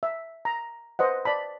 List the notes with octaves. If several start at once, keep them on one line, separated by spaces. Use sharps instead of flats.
E5
A#5
B4 C5 D#5 F#5
D5 A5 B5